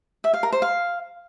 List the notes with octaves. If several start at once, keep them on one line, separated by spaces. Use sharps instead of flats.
E5
F5
A#4
C5
F5